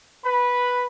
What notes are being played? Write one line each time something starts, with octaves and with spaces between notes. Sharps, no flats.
B4 B5